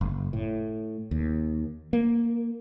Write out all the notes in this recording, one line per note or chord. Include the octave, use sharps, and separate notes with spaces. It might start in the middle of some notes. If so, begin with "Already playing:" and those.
F#1
A2
D#2
A#3